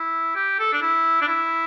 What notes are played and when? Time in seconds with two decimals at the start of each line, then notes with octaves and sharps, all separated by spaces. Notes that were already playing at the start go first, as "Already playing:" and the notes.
Already playing: E4
0.36 G4
0.59 A4
0.73 D4
0.82 E4
1.22 D4
1.28 E4